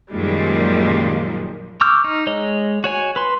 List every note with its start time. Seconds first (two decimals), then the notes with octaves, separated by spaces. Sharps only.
0.11 F#2 A#2 D#3 F3 G3 G#3
1.81 C#6 D6 E6 F6 G6
2.04 D#4
2.27 G#3 C#5 D#5
2.84 F#4 C#5 G#5
3.16 B4 C6